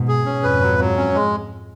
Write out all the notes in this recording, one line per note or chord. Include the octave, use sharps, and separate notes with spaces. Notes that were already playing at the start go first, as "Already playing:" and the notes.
Already playing: G#2 B2
G#4
C#4
F2 G#2 B4
F#3
F#3
C#4
G#3